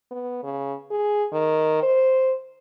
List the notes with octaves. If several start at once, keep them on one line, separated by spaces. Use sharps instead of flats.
B3
C#3
G#4
D#3
C5